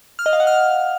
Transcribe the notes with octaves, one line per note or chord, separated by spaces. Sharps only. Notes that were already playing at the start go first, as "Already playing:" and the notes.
F6
D#5
F5
F#5
F6